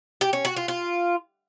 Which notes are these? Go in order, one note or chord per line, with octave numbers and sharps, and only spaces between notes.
G4
C#4
F#4
F4
F4